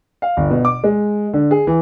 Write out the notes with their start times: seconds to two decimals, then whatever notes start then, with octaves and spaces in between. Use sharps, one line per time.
0.22 F5
0.37 G1
0.50 B2
0.65 D6
0.84 G#3
1.33 D3
1.51 G#4
1.67 E3